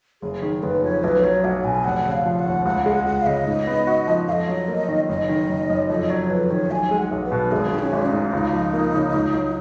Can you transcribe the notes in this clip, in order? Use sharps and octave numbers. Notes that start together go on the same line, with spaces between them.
F#1 G#4
D#3 G#4
F#1 B4
F2 C#5
B1 B4
F#3 C#5
B1 F#5
B2 G#5
F1 F#5
C#3
F5
F3
F#5
D#2
C#2 F#5
G#3 F#5
C#2 F#5
F5
C#3 D#5
G#2
B3
F#4
F3
F2 D#5 F5
F#3
A#3
D#3
F#1 D#5
D#3
F#1
F#2
F2 D#5
F#3 C#5
F2 B4
D#3 C#5
B1 G#5
G#3
F#5
B1
B4
B2
G#1 G#4
D#3
D#4
C#4
G#1
D#4
G#2
C#2
F3
A#3
C#3
C#2
F#3